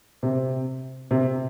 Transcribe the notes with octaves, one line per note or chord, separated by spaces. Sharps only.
C3
C3